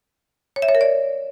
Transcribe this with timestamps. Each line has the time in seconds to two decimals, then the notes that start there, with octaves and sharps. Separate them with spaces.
0.56 C#5
0.62 E5
0.69 C#5
0.75 A#4
0.81 D5